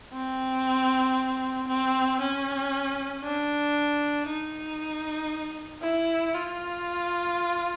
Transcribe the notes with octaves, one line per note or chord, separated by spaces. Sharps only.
C4
C4
C#4
D4
D#4
E4
F4